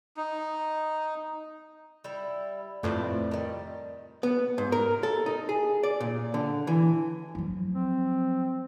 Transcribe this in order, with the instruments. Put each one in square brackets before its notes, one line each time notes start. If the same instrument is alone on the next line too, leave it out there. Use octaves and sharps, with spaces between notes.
[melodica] D#4
[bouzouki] G3 E4
[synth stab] F2 A2 [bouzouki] B4 C5 D5
[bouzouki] D#3 G3
[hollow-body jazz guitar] B3
G#2
A#4
A4
D#4
G#4
D5
A#2
D3
E3
[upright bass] F3 F#3
[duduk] C4